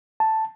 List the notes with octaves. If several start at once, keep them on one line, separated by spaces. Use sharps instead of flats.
A5